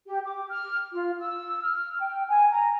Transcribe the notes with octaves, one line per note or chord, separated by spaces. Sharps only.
G4
D6
F6
F4
E6
F6
G5
G#5
A#5